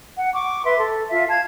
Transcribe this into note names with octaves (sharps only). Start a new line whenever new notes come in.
F#5
C#6 D6
B4 E5 C6
A4
F4 E5 F5
F5 A5 G#6